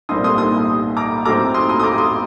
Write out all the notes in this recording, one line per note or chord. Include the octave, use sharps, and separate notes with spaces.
C2 A#2 G3 C4 D#4 C6 D#6
C6 D#6
C6 D#6
A#5 D6
A2 F#3 C4 D#4 A#5 D6
C6 D#6
C6 D#6
D#6
A#5 D6
C6 D#6